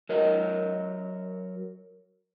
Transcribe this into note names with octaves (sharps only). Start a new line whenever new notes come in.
F#3 A#4 D#5